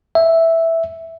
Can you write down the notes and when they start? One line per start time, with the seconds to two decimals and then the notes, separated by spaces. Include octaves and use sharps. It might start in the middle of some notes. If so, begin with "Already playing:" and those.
0.15 E5